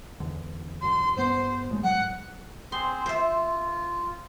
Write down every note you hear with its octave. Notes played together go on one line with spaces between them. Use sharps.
E2 D3
E1 F#2 C6
G2 B3 C5
G1 A2 G#3
G#2 F#3 F#5
C4 G#4 C5 C6
F4 C5 E5